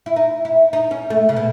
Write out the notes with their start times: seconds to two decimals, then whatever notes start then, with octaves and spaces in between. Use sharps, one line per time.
0.06 E4
0.16 D#4
0.45 E4
0.73 D#4
0.91 C#4
1.10 A3
1.29 C#3
1.36 B2